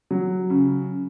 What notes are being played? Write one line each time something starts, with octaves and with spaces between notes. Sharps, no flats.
F#3
C#3